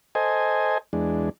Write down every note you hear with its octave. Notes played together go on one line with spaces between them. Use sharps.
A4 C5 D#5 G#5
E2 G#3 D4